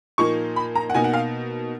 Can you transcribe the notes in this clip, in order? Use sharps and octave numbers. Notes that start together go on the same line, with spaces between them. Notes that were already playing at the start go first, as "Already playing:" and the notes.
A#2 F3 A#3 D#4 C#6
B5
A#5
F#5
B2 A#3 D#4 G#5
F#5
F5